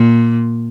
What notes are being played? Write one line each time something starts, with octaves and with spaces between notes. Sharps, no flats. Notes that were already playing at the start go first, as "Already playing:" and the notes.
Already playing: A#2